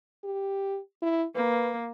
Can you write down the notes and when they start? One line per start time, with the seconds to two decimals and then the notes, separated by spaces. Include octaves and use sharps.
0.24 G4
1.02 E4
1.36 A#3 B4